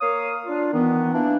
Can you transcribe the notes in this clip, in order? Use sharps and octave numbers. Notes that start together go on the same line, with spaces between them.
A#3 C#5 F5 D#6
D4 F4
D#3 E3 B3
E3 A#3 D4